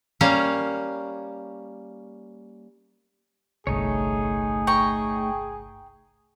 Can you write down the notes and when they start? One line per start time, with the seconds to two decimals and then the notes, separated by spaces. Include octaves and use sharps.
0.21 G3 A#3 C#4 C#5 F5
3.67 G1 C2 A3 D#4 G#4 C#5
4.67 G5 A#5 C#6